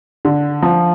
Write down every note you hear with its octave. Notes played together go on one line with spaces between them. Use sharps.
D3
F3